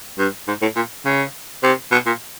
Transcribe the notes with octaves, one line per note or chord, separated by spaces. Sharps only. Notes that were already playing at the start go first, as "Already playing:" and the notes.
G2
G#2
A2
A#2
C#3
C3
B2
A#2